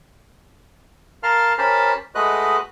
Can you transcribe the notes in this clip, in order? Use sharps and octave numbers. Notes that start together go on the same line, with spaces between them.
A#4 F5 A5 C6 F6
C#4 G4 A#4 C5 A5 B5
G#3 A3 F#4 B4 D#5 F#6